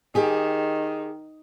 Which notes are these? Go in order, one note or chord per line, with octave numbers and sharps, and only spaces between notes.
D#3 G4 G#4